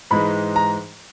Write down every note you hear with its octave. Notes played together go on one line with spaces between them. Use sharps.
G#2 E3 G#3 B5
A#5